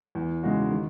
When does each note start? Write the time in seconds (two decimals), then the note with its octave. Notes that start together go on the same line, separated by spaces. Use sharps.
0.15 E2
0.43 C#3 G#3 D#4 F#4
0.71 D#3